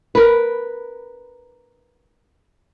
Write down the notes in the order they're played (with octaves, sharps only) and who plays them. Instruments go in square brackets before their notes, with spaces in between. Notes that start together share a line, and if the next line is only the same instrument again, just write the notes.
[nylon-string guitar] A#4 B4